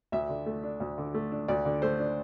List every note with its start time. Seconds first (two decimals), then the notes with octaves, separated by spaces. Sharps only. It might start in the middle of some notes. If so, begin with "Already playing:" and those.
0.12 D2 E5
0.29 D3
0.46 A3
0.63 D4
0.80 D2
0.98 D3
1.14 A3
1.32 D4
1.48 D2 D5
1.65 D3
1.82 A3 C5
2.00 D4